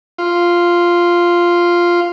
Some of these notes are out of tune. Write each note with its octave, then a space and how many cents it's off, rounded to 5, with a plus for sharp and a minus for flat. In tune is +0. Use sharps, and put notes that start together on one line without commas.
F4 -5